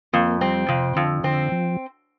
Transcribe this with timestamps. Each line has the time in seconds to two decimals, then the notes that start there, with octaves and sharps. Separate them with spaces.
0.13 F2 A#3
0.41 G3 C4
0.68 F2 C3
0.96 F2 D3
1.24 D3 C4
1.52 F3